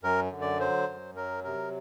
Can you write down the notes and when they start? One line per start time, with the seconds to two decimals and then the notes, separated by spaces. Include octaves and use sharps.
0.03 F#2 A#4
0.32 D3
0.41 D5
0.59 F#3 C5
0.88 F#2
1.16 F#3 A#4
1.44 C3 A#4